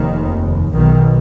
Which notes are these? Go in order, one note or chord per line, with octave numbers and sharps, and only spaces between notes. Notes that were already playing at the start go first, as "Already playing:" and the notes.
Already playing: F1 D#2 D#3
B1 B2 D#3